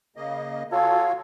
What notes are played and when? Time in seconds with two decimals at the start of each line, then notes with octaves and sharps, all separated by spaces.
0.16 C#3 A#3 D#5
0.72 F4 F#4 A4 C#5 F5